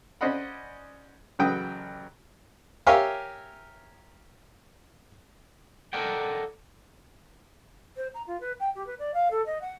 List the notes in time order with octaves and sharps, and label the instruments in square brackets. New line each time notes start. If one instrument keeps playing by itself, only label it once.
[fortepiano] C#4 C5 D5 D#5 F#5 B5
A1 C#3 F#3 B4 G5 D#6
G4 A#4 C#5 E5 F5 G#5
[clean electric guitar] A4 A#4 D5 D#5 F#5 G5
[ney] C5
A#5
F4
B4
G5
G4
B4
D5
F5
A4
D#5
F#5